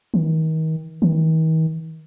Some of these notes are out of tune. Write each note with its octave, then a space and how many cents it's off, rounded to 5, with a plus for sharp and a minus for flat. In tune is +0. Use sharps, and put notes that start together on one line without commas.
D#3 +35
D#3 +45